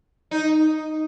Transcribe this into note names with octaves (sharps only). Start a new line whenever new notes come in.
D#4